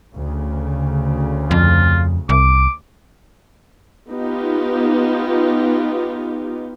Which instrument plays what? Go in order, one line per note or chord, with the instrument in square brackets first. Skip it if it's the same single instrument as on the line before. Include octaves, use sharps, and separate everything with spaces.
[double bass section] D2 C#3
[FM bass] F2 [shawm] F4
[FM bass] C2 [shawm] D6
[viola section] B3 D#4 F4 G4